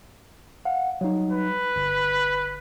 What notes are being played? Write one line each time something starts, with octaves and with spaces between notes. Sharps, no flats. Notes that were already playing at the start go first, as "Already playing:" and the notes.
F5 F#5
F#3 G3 D#4
B4
G1